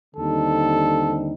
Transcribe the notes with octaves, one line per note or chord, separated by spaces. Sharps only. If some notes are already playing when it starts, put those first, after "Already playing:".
D#2 D3 G3 C4 D#4 A4